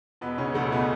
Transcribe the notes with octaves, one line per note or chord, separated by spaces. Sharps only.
E1 B2 B3
C#3 C#4
D2 D3 A3 A4
B2 B3